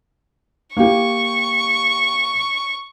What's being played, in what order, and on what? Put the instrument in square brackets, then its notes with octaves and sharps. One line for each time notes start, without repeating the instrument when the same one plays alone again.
[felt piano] A#3 G4 [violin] C#6